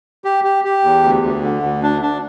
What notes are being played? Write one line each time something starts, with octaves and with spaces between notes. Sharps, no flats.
G4
G4
G4
E2
D2
D2
D3
D2
D4
D4